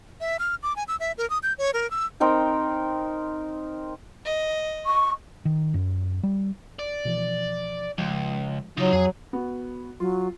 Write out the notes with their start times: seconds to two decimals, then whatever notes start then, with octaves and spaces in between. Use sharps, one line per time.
0.20 E5
0.39 F6
0.63 D6
0.76 G#5
0.88 E6
1.00 E5
1.18 A#4
1.30 D#6
1.43 G6
1.58 C#5
1.74 A#4
1.91 E6
2.20 C4 D#4 A#4 G5
4.25 D#5
4.86 C#6
5.45 D#3
5.74 F#2
6.23 G3
6.79 D5
7.05 B2 E3 F3
7.98 C#2 F3 G#3
8.78 C#3 F#3 D#4 F4
8.93 F2 G#4 G#5
9.33 B3 F#4
10.00 F#3 F4